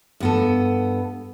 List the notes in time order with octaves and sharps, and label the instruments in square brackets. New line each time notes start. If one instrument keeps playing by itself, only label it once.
[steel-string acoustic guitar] G2 B3 A4